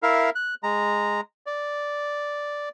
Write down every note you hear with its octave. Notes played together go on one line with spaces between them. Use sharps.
E4 A#4 E5 F5
F#6
G#3 A#5
D5